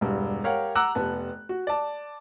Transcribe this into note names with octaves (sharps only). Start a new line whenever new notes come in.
E1 G2
G4 A#4 C#5 F5 F#5
F#5 A#5 D6 E6 F#6
F1 B3 A5
F#4
D5 A5